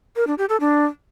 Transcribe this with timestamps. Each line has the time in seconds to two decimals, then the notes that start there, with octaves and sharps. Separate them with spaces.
0.16 A#4
0.27 D4
0.38 G4
0.49 A4
0.60 D4